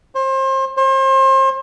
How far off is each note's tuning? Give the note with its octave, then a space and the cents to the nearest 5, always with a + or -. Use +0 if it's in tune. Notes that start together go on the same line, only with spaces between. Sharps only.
C5 +30
C5 +35